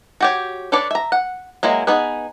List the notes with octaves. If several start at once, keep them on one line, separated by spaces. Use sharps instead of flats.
F#4 G4 C#5
D4 A4 B4 C#5 D5
E5 A#5
F#5
F#3 G#3 A#3 E4
B3 D#4 G#4 B4